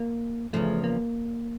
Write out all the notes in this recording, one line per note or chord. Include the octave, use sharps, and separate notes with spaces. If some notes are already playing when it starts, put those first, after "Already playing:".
Already playing: A#3
E2 C#3 F3 A3
A#3